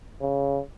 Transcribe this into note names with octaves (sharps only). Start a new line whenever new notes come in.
C#3